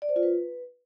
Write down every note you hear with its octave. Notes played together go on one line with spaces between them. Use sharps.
D5
C5
F4
B4